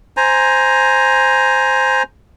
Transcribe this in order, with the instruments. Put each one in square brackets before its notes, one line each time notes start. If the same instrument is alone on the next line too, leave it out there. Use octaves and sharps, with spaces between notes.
[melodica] C5 G#5 A#5